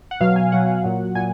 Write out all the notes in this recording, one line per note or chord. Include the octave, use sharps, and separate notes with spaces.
F#5
B2 F#3 F5
G#5
B2 F#3 F#5
A#2 F#3
A#2 G#5